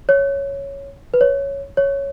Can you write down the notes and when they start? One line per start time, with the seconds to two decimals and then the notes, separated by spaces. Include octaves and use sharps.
0.09 C#5
1.14 B4
1.21 C#5
1.77 C#5